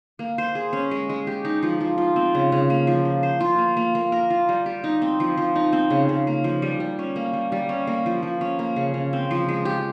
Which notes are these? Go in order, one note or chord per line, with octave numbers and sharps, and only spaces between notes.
A#3
C5
G#4
C#4
G#3
G#3
G4
D#4
F3
F3
F4
C4
C#3
C#3
A#3
F3
F3
C5
F4
A#3
A#3
A#3
A#4
F4
G3
G4
D#4
C4
F3
F3
D#4
C4
C#3
C#3
A#3
F3
G3
G3
C#4
A#3
G3
G3
C#4
A#3
F3
F3
C#4
A#3
C#3
C#3
C4
F3
G#3
G4